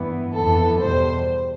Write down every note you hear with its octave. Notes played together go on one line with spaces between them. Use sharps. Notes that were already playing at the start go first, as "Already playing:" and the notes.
Already playing: G2 E3 B3
F2 E3 B3 A4
E2 B2 G3 C5